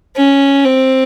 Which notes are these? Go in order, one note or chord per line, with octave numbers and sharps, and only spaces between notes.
C#4
C4